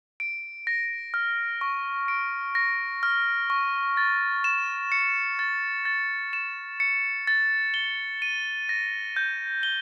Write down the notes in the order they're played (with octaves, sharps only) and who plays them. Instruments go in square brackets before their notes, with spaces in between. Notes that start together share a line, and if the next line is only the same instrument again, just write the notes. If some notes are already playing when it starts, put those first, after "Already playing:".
[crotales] D7
A#6
F6
C#6
D7
A#6
F6
C#6
A6
E7
C#7
A6
A6
E7
C#7
A6
G7
D#7
A#6
G6
G7